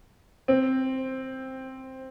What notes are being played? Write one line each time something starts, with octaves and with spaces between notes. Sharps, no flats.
C4